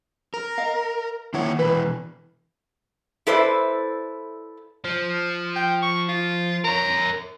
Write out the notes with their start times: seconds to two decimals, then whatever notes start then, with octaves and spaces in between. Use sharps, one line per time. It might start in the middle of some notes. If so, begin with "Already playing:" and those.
0.34 A#4
0.58 D#5 F5
1.34 D#3 A#3 E4 C#5 F#5
1.59 B2 E3 B4
3.27 E4 A4 B4 C5 D5 E5
4.85 F3
5.56 G5
5.82 C#6
6.09 F4
6.64 A#4 C#5 A#5